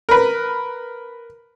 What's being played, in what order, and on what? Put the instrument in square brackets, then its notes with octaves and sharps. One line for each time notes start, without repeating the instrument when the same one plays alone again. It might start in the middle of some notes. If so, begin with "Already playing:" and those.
[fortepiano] A#4 B4